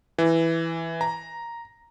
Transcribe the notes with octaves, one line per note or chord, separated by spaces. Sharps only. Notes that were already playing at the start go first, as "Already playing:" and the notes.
E3
A#5